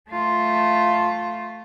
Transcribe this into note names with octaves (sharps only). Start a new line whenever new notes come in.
A3 F4